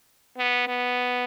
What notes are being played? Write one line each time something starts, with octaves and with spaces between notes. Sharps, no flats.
B3
B3